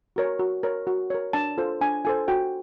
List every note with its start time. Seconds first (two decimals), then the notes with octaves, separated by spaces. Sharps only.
0.16 F#4 A#4 C#5
0.39 F#4
0.63 A#4 C#5
0.87 F#4
1.10 A#4 C#5
1.33 D4 A5
1.58 F4 A4 C5
1.81 D4 G#5
2.05 F4 A4 C5 G#5
2.28 F#4 G5